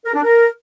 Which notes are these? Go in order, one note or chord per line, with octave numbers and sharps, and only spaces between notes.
A#4
D4
A#4